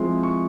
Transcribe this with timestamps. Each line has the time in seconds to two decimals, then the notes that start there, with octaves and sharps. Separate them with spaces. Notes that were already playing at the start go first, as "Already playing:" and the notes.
Already playing: F3 G#3 C4 E4 C6
0.23 C#6